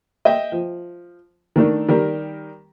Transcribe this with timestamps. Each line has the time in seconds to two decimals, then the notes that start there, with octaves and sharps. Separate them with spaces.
0.25 D#5 E5 G5
0.52 F3
1.56 D#3 A3 D4 D#4
1.88 D#3 G3 G4 A#4